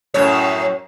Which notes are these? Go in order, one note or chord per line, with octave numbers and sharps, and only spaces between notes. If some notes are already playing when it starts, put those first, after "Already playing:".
F#2 A2 C#5